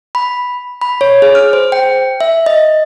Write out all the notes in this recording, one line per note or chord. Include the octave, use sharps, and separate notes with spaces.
B5
B5
C#5
G#4
F6
C5
G5
E5
D#5